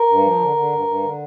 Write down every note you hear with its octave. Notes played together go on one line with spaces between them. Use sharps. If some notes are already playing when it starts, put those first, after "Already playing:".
Already playing: A#4
G2
F3
D3
D3
G2
G2
D3